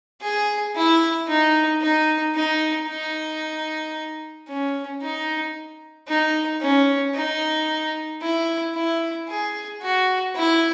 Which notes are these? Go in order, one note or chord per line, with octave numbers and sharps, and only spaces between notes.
G#4
E4
D#4
D#4
D#4
D#4
C#4
D#4
D#4
C#4
D#4
E4
E4
G#4
F#4
E4